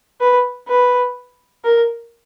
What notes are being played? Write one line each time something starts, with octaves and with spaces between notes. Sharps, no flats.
B4
B4
A#4